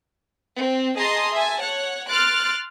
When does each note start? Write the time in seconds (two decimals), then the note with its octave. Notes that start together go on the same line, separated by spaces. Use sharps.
0.58 C4
0.97 G#4 D#5 A5 A#5 C6 D#6
1.33 E5 G#5 A5
1.62 C#5 F#5
2.09 C6 F6 F#6 A6 D7